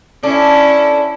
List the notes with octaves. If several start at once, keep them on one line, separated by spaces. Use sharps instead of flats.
C#4 D4 E4 A4